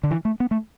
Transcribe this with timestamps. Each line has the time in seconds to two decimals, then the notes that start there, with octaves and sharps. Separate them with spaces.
0.03 D3
0.11 E3
0.25 A3
0.40 B3
0.51 A3